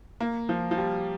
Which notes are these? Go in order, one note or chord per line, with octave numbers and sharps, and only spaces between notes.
A#3
F3
F3
G3